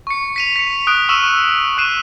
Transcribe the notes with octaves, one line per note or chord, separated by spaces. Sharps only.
C#6 C#7
B6 D#7 F7
B6 C#7
D#6 F#6 D7
C#6 E6 F6 D#7 E7
C#6 F#6 C7 D#7 E7